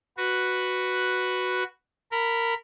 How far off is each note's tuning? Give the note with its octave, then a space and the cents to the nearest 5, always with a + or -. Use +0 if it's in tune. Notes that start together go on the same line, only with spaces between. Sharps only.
F#4 +0 B4 +0
A#4 -15 B5 +0